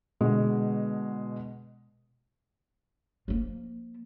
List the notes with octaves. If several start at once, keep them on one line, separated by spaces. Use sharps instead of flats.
B2 D3 G#3 D#5
F3 A#3